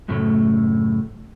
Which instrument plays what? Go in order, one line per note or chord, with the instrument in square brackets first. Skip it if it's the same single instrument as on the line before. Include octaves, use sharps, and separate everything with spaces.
[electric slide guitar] F#2 A2 C#3 A3